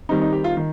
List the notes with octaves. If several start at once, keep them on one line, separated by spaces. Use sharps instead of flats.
D#3 G3 C4 D#4
D#4
G4
F4
D#3